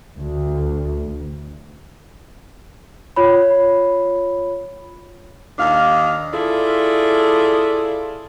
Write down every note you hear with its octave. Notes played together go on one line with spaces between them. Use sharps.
D2
F4 C#5 B5
D#2 D4 D#4 F5
E4 F4 G#4 A4 D5